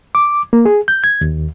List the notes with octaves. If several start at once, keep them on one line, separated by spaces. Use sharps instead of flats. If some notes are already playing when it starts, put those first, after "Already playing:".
D6
A#3
G#4
G6
G#6
D#2